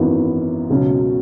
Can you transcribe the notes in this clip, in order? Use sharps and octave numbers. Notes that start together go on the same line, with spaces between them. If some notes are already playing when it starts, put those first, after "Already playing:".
Already playing: G#1 F#2 E3 B3
C#2 B2 F#3 C#4